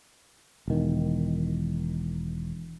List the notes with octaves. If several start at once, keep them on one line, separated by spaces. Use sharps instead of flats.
E1 D#3